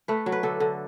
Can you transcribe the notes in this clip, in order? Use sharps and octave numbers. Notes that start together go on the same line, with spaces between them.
A3 B4
F#3
B4
D3 A4
D3